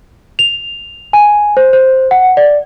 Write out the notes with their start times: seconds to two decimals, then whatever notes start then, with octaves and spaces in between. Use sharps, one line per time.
0.39 F7
1.13 G#5
1.57 C5
1.73 C5
2.11 F#5
2.37 D5